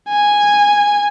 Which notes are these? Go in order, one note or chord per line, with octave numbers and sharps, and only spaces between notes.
G#5